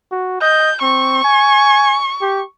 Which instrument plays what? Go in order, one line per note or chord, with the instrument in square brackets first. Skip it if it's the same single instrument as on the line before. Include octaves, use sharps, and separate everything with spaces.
[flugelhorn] F#4
[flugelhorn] D#5 [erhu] G6
[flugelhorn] C4 [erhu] C#6
[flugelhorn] G#5
G4